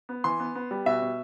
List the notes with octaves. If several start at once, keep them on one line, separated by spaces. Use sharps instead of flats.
B3
E3 C6
B3
B3
G3
B2 E5
B2